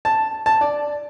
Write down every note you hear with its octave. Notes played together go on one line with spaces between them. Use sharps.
A5
A5
D5